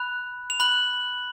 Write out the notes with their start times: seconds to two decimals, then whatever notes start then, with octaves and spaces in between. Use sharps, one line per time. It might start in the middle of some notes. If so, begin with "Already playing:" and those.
Already playing: B5 F#6 F7
0.50 F7
0.60 B5 F#6 F#7